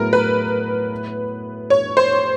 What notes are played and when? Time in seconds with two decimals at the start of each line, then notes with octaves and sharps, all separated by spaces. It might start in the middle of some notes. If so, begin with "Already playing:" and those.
Already playing: A2 F#3 B3 E4 G#4 A#4
0.13 B4
1.70 C#5
1.97 C5